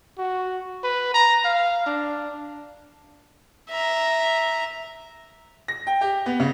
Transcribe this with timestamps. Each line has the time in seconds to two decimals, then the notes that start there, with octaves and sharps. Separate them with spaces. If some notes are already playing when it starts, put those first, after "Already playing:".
0.18 F#4
0.84 B4
1.14 A#5
1.45 F5
1.86 D4
3.70 E5 A#5
5.68 A#6
5.87 G5
6.01 G4
6.26 B3
6.40 C#3